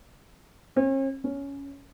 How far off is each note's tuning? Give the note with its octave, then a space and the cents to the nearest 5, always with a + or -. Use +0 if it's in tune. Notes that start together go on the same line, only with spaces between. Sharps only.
C#4 -45
C#4 +10